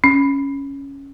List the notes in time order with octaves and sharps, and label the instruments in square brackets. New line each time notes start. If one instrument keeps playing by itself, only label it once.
[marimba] C#4